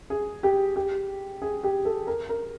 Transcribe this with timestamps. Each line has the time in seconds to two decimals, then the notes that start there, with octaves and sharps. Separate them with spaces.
0.10 G#4
0.43 G4
0.76 G4
1.42 G#4
1.63 G4
1.85 A4
2.07 A#4
2.29 A#4